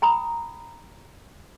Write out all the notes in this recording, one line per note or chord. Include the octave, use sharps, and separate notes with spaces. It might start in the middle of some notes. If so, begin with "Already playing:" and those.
G5 A#5 B5 D#6